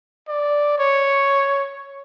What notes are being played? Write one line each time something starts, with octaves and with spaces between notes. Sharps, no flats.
D5
C#5